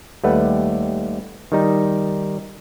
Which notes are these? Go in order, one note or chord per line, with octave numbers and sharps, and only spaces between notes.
D#2 G3 A3 B4 F#5
D#3 G3 D#4